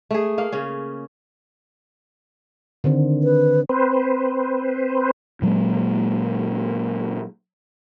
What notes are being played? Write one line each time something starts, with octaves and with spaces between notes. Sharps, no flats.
A3 G#4
A#3 F5
C#3 C#4
D3 D#3 C4
B4
C4 B4 C5
A#2 F#3 G#3 A#3